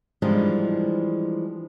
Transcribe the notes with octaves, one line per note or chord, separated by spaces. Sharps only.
E3 F3 G3 G#3 D4 D#4